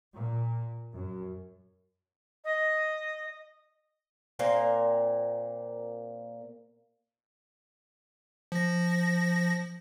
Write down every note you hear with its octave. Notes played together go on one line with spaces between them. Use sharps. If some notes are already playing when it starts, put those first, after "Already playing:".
A#2
F#2
D#5
A#2 A#3 C4 A#4
F3 A#6